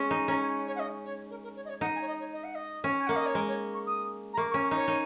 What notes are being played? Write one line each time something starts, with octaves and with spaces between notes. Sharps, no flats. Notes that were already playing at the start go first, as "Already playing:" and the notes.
Already playing: G#3 C#4
D#4
C#4 A#5
G#5
C#5
F#5
D#5
C#5
A#4
A#4
C#5
D#5
C#5
D#4 F#5
G#5
C#5
D#5
C#5
D#5
F#5
D#5
C#4
G#5
A#3 F#5
D#5
C#5
G#3 A#4
C#5
C#6
D#6
A#5
A#3 C#6
C#6
C#4
C#6
D#4 C#5
D#4